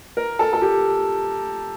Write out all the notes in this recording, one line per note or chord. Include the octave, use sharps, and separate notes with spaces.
A#4
A4
A4
G4